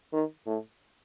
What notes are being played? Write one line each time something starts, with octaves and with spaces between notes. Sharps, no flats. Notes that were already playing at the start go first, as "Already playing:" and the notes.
D#3
A2